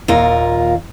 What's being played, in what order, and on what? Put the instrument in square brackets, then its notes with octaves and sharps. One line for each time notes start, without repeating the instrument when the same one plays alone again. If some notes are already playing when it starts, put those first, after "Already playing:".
[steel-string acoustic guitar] D#2 A#2 F4 A#4